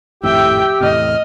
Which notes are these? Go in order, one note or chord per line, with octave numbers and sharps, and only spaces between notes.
G#1 F2 A2 G4 E5 G5 E6
E2 A2 C3 D#5 F6